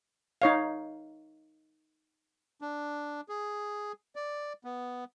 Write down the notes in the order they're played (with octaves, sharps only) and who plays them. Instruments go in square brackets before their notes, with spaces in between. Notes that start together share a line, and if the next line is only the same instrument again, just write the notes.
[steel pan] D#4 C#5 F5
[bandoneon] D4
G#4
D5
B3